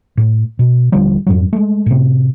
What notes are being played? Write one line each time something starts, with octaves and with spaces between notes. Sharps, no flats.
A2
B2
D#1 D3 F3 G3
F2 G#2 F#3
G#3 A3
A2 C3